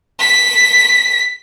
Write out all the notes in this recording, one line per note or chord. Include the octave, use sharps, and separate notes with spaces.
B6